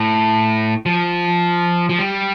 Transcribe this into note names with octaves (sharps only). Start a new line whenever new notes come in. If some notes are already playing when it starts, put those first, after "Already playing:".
Already playing: A2
F3
F3
G3